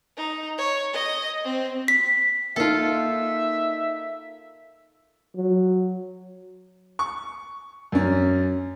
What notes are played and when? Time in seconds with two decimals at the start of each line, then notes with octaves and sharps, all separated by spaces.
0.17 D#4
0.58 C#5
0.93 D#5
1.44 C4
1.88 B6
2.56 A#3 D#4 F4 A4 E5
5.35 F#3
6.99 C#6
7.92 F#2 C#4